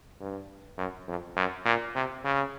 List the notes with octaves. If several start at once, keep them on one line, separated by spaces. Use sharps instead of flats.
G2
F#2
F2
F#2
A#2
C3
C#3